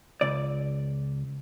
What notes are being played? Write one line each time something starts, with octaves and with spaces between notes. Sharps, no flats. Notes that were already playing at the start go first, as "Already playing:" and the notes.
C#2 D5